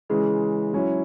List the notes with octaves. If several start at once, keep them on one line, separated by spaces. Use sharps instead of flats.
C#3 E3 G#3
F#3 C#4 E4